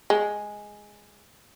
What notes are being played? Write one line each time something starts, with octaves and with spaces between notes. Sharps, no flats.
G#3